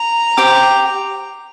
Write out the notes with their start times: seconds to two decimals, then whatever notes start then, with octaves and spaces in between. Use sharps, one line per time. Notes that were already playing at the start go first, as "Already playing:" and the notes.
Already playing: A#5
0.37 G4 C5 G5 D6